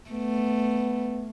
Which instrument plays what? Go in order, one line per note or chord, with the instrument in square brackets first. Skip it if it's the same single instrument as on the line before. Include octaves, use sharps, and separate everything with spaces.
[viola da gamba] A3 [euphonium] B3